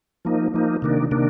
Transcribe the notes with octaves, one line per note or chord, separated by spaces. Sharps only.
F3 A#3 D#4
F3 A#3 D#4
C3 D#3 A#3 D4
C3 D#3 A#3 D4